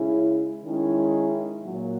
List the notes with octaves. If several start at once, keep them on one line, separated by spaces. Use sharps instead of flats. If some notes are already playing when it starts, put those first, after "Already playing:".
Already playing: C#3 G#3 C#4 E4
D#3 G#3 C#4 E4
A#2 F#3 A#3